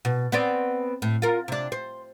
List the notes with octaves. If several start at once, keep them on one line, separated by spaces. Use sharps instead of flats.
B2
B3 C4 D5
A2
F4 A#4
C3 D4
C5